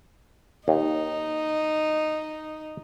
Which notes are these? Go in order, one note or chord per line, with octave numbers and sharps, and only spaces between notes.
D#2 D#4